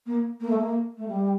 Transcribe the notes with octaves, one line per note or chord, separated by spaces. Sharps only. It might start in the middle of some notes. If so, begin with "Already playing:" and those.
A#3
A#3
A3
A#3
A3
G3